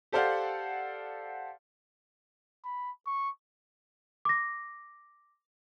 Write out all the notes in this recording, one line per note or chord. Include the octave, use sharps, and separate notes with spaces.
G4 A4 C5 D5 F5 F#5
B5
C#6
D6 A#6